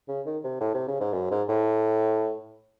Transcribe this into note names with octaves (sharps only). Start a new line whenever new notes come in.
C#3
D#3
C3
A2
C3
C#3
G#2
F#2
G#2
A2